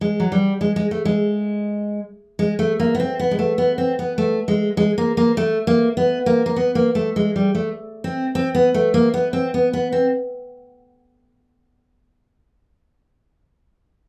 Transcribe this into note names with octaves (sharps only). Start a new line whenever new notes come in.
G#3
F#3
G3
G#3
G#3
A3
G#3
G#3
A3
A#3
B3
C4
B3
G#3
A3
B3
C4
B3
A3
G#3
G#3
A#3
A#3
A3
A#3
B3
A#3
A#3
B3
A#3
A3
G#3
G3
A3
C4
C4
B3
A3
A#3
B3
C4
B3
B3
C4